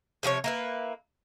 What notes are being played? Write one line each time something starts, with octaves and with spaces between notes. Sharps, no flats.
C3 F3 F#4 C#5
A#3 E4 B4